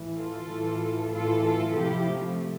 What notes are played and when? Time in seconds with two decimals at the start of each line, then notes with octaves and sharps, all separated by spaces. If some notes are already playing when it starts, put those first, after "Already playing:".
Already playing: A2 E3
0.15 F4 A4
0.47 A2 E3
1.11 A2 E3 F4 A4
1.43 F4 A4
1.75 C3 F3 E4 G4
2.08 A3